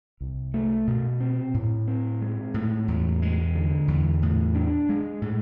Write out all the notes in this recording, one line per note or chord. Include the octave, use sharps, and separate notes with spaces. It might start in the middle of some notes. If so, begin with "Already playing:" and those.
C2
A3
B2
C4
A2
C4
G#3
A2
E2
G#3
D3
E2
A2
D4
G#3
A2